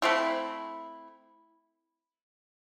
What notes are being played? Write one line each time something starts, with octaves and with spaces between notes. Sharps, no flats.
A3 C4 E4